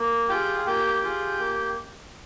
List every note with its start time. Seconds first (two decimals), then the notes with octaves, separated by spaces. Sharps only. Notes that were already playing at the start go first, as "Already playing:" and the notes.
Already playing: A#3
0.29 F4 G4 G#4 G5
0.66 A#3 G4 G5
1.03 F4 G#4
1.39 A#3